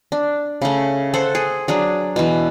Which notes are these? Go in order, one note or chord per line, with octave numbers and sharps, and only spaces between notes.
D4
C#3 A3
A4 C5 F#5
G#4
F#3 D4 G#4
B2 E3